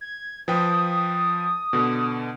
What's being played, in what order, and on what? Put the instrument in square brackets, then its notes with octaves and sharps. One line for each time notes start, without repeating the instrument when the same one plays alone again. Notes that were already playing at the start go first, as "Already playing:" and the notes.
[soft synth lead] G#6
[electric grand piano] F3 B4 G5 [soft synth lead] D#6
[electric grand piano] B2 D3